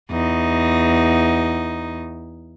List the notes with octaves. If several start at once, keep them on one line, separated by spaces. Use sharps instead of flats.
E2 D#4